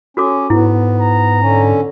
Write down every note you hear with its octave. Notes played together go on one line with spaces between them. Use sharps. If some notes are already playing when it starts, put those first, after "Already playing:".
C#4 F#4 A4 D6
G#2 B3 E4
A#5
D3 C#4